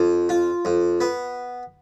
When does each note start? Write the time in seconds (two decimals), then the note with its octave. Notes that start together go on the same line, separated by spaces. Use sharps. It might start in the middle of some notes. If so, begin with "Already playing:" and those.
Already playing: F2
0.29 F4
0.65 F2
1.01 B3